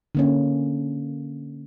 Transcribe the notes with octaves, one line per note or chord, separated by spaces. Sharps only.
D3 A#3 C#4